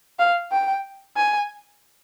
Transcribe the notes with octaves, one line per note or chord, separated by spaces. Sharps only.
F5
G5
G#5